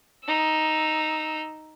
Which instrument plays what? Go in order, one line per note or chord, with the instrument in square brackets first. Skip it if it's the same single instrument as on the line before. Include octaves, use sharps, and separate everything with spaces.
[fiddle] D#4 E6